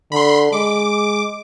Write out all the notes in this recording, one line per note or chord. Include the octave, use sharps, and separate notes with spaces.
D3 B5 C6
G#3 D6